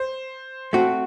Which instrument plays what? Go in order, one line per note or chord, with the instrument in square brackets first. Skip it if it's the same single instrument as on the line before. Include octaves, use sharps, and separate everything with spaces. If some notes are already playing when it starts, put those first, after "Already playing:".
Already playing: [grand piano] C5
[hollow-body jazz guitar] A3 C4 F#4